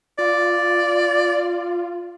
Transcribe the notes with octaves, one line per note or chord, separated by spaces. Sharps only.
F4 D5